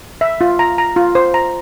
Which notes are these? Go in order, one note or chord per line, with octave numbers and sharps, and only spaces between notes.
E5
F4
A#5
A#5
F4
C5
A#5